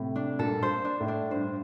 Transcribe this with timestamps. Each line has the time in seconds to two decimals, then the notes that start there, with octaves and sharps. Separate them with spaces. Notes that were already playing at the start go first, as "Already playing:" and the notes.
Already playing: A2 C3
0.16 D4
0.39 G2 A#2 A4
0.63 C5
0.85 D4
1.00 A2
1.08 D4
1.31 G2 C5